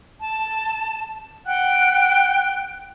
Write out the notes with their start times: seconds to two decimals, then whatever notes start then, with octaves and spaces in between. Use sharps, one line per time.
0.20 A5
1.46 F#5 G5 F#6